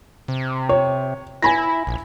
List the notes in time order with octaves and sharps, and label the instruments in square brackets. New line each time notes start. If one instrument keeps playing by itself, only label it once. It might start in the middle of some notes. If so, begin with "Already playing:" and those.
[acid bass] C3
[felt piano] C#5
[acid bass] E4 [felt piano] G#5 B5 A#6
[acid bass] A#1